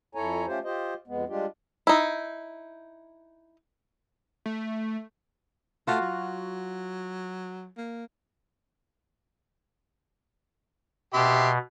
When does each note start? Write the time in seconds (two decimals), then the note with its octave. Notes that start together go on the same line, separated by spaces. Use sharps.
0.15 F2 E4 A4 C#5 G#5 A#5
0.47 A3 C#4 F4 G4 C5
0.64 F4 G4 C5 D#5
1.08 F2 G#3 B3
1.28 G3 G#3 D4 F4 G4
1.87 D#4 E4
4.46 A3
5.87 A3 F4 F#4 F5
6.01 F#3
7.77 A#3
11.14 B2 G4 E5 C6